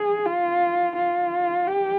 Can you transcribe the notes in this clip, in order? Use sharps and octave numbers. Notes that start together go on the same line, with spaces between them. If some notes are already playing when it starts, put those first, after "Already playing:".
Already playing: G#4
F4
F4
G4